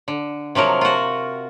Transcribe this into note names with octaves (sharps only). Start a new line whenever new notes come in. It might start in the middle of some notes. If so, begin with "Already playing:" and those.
D3
C3 F3 F#3 A#4
F4 F#4